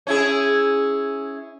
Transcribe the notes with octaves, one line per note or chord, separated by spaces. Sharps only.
C#4 E4 G#4